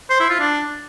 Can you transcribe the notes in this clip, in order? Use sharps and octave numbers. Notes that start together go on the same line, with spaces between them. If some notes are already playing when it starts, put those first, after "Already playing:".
C5
E4
F4
D4